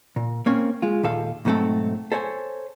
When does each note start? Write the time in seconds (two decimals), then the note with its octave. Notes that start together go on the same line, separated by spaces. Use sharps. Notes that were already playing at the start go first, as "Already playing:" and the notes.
0.16 A#2
0.46 A#3 C4 C#4 C#5
0.82 G#3 F4
1.03 D#2 A#2 A4 F5
1.45 B1 G#2 F#3 A3 C4 A4
2.12 A4 C5 C#5 G5 G#5